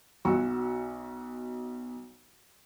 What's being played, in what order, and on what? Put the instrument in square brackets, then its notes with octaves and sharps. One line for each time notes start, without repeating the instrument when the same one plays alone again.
[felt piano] B1 F#4 C#6 E6